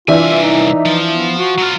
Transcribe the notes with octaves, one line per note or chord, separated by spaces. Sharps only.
C2 E3 D4 F4 E5 G#5
D#4
F3
B3
F#4
F#3 F4